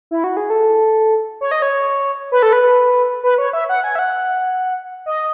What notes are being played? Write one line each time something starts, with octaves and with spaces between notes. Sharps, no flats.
E4
F#4
G#4
A4
C#5
D#5
C#5
B4
A4
B4
B4
C#5
E5
F#5
G#5
E5
F#5
D#5